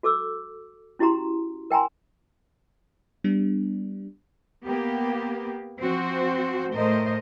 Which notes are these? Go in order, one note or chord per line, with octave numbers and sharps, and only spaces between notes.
F#4 A4 D6 E6
C#4 E4 F#4 G4 A#5 C6
A#4 G5 G#5 A#5 C6
G3 B3 D4
A#3 B3 G4
F3 C4 F#4 C5
A2 A3 A#4 C5 D#5